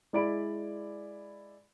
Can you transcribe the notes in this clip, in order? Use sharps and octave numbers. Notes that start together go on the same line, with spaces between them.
G#3 E4 D5 B5 D7